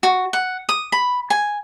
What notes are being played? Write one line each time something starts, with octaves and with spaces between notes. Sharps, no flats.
F#4
F#5
D#6
B5
G#5